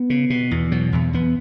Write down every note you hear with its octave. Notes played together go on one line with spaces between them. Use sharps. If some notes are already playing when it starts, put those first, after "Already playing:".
Already playing: B3
C#3
B2
E2
B2 F#3
E2
E2 B3